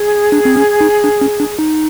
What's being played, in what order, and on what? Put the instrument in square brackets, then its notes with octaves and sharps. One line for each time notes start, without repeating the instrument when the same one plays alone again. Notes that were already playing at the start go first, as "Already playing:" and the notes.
Already playing: [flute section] G#4
[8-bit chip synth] D4
C4
C#4
D#4
D4
C#4
D4
D#4